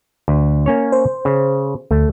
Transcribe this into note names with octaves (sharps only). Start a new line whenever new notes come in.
D2
A#3 C#4 C#5
C5
C#3
D2 A3